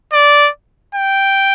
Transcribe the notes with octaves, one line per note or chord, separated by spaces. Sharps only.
D5
G5